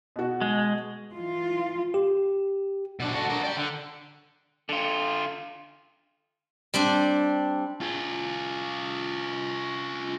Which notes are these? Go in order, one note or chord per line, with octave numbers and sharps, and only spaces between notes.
B2 F#4
G#3
E3 F4
G4
B2 D4
F#4 A4
D4 A#4
D5 G5
D3
D3 F4
G3 C4 D4
F4 G#4